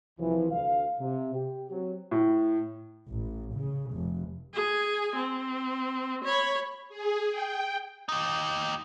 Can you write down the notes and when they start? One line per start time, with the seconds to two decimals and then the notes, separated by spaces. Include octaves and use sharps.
0.19 C2 E3 F3
0.51 D2 F5
1.00 C3
1.34 G4
1.71 F#3 C4
2.11 A2
3.09 A1
3.55 C#3
3.92 F1
4.54 G#4 G#5
5.15 C4
6.24 C#5 B5
6.89 G#4
7.30 G5
8.09 D#4 G4